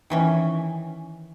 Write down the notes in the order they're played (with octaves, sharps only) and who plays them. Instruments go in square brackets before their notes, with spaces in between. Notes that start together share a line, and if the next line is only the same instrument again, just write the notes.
[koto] D#3 E3 C#4